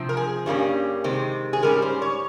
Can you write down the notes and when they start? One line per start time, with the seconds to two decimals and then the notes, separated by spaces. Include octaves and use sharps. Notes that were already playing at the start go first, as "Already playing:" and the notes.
Already playing: C3 F3 C4
0.09 A#4
0.17 G#4
0.46 G2 G3 A#3 C#4
1.04 C3 D#3 G#3 C4
1.53 G#4
1.62 G#2 G3 C#4 A#4
1.82 C5
2.02 C#5